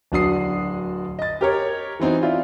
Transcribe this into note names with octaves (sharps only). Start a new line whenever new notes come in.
D1 D4 F#4 D#6 C7
D#5 A6
G4 A#4 C#5
E3 B3 C4 D#4 F#4
E4 F4 D5